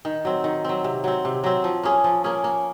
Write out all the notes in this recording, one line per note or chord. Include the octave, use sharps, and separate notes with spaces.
D#3
F#3 C4
D#3
F#3 C4
C3
F#3 C4
C3
F#3 C4
F3
A#3 C#4 G#4
F3
A#3 C#4 G#4
A#3